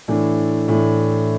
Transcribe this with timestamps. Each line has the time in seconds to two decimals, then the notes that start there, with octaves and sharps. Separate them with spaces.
0.08 A2 E3 A3 D4
0.68 A2 E3 A3 D4